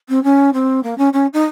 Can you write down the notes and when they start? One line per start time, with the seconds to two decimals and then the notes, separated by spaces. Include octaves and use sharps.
0.09 C4
0.24 C#4
0.54 C4
0.83 A#3
0.98 C#4
1.13 C#4
1.33 D#4